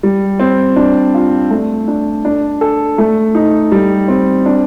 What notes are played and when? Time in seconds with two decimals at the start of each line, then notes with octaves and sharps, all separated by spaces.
0.03 G3
0.40 C4
0.76 D4
1.14 F4
1.51 A3
1.88 D4
2.25 D4
2.61 A4
2.98 A3
3.35 D#4
3.72 G3
4.08 C4
4.46 D4